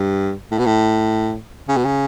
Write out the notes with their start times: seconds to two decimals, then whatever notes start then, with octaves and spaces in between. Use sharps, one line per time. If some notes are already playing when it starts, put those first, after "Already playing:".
Already playing: G2
0.51 A2
0.59 B2
0.66 A2
1.69 C#3
1.77 B2
1.85 C#3